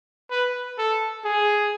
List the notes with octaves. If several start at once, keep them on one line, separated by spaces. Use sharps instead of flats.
B4
A4
G#4